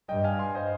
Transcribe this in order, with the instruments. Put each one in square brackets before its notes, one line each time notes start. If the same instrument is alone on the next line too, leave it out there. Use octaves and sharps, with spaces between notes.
[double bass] G2 [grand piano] D#5 G5
[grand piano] F5 G#5
G#5 C6
C5 D#5